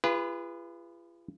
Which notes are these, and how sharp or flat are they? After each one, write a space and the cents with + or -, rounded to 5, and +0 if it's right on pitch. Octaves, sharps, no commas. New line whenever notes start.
F4 -40 G#4 -40 B4 +0